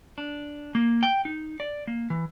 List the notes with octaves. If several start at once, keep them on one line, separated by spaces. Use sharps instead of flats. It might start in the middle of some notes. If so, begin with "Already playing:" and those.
D4
A#3
G5
D#4
D5
A#3
E3